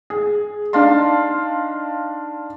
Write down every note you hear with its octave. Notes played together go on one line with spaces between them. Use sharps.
G#4
D4 D#4 F5 A5 C6